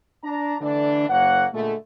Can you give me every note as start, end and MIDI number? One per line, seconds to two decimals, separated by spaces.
0.24 0.56 62
0.24 0.56 82
0.61 1.07 50
0.61 1.07 52
0.61 1.07 57
0.61 1.07 62
1.09 1.46 30
1.09 1.46 58
1.09 1.46 73
1.09 1.46 78
1.53 1.74 46
1.53 1.74 50
1.53 1.74 56
1.53 1.74 57